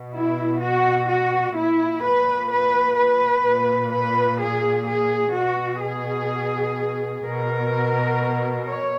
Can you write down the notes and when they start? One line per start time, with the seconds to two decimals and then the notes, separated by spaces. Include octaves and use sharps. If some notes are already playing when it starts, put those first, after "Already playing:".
Already playing: B2
0.15 E4
0.63 F#4
1.10 F#4
1.57 A#2 E4
2.05 B4
2.51 B4
2.99 B4
3.46 A#2
3.93 B4
4.41 G#4
4.89 G#4
5.35 B2 F#4
5.83 G#4
7.25 B2 A#4
8.67 C#5